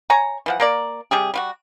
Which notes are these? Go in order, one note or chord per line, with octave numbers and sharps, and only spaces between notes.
C#5 G#5 A#5
E3 F3 F#5
A#3 A#4 D5
C3 G3 G4 G#4
G3 F4 F#4